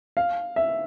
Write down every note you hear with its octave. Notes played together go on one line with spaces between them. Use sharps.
F5
E5